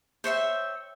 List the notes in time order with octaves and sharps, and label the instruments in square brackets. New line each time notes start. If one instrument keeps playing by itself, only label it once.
[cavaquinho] C5 C#5 E5 G5